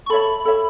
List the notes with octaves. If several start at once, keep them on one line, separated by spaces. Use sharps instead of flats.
C#6
A4 C#5 E5 B5
A4 C#5 E5